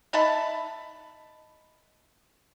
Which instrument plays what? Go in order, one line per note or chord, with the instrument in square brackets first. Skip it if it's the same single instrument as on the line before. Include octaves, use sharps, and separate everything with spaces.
[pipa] D#4 E5 A5 B5